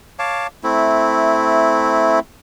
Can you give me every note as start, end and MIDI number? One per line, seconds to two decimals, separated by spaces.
0.19 0.47 73
0.19 0.47 77
0.19 0.47 81
0.19 0.47 86
0.63 2.19 57
0.63 2.19 60
0.63 2.19 64